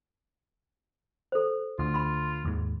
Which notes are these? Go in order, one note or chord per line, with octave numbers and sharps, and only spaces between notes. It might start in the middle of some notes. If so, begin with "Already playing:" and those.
A4 C5
D2 F4
B5 C6
D#2 G#2